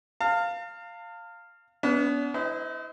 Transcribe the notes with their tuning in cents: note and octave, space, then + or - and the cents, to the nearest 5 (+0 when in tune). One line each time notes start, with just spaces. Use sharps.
F5 +0 A5 +45
B3 +0 D4 -45
E4 -30 C5 -40 D#5 +15